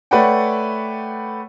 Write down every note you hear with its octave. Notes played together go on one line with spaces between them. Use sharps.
A3 B4 C#5 D5 F#5 G5